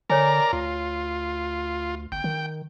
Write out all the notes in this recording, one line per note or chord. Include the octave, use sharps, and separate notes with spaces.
D3 A#4 C#5 D5 G#5 A#5
D2 F4
G1 G5
D#3